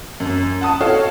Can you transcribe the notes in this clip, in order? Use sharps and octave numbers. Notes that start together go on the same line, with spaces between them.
F#2
F#5 A5 D#6
F#4 A4 C#5 F5